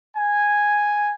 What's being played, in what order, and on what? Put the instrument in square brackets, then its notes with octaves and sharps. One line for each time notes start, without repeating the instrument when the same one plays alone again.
[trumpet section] G#5